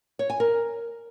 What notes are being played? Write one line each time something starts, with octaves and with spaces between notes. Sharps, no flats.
C#5
G#5
A#4